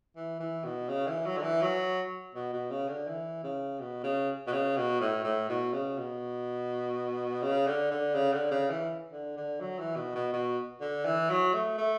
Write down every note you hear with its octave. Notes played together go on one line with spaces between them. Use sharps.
E3
E3
B2
C#3
E3
F#3
D3
E3
F#3
B2
B2
C#3
D3
E3
C#3
B2
C#3
B2
C#3
B2
A2
A2
B2
C#3
B2
C#3
D3
D3
C#3
D3
C#3
E3
D3
D3
F#3
E3
B2
B2
B2
D3
E3
F#3
A3
A3